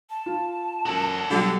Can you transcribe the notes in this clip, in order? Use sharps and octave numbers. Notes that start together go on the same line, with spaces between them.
A5
F4
F#2 F#4 A4
B2 D3 F#3 G3